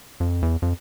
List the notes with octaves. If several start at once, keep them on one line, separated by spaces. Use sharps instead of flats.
F2
E2
F2